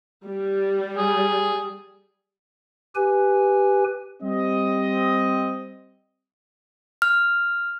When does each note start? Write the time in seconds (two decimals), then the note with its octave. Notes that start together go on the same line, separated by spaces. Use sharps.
0.25 G3
0.97 G#4
2.96 G4 B4 G#5
4.23 G3 C4 D#5
7.02 F6